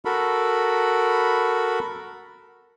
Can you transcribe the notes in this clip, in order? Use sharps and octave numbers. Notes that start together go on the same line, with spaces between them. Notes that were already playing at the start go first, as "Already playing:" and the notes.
F#4 A4 A#4 B5